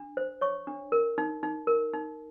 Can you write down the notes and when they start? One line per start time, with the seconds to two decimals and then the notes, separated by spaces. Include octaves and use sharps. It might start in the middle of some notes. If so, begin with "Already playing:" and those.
Already playing: D4
0.17 C5
0.41 C#5 C#6
0.67 D4
0.92 A#4
1.18 D#4
1.43 D#4
1.67 A#4
1.93 D#4